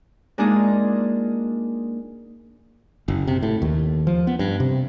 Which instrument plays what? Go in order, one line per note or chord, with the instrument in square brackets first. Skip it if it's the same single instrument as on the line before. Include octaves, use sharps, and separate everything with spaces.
[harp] G#3 A#3 D4 D#4 F4 G#4
[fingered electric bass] F#1
C3
A2
D#2
F3
B3
G2
C3